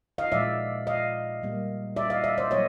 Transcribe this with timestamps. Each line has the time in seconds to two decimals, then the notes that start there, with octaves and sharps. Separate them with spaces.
0.18 D#5 F5
0.32 A#2 F3 G#3 D5 E5
0.87 D#5 F5
1.42 A#2 G3 A#3
1.96 D5 E5
2.10 D#5 F5
2.24 D5 E5
2.38 C5 D5
2.51 F#3 A#3 C#5 D#5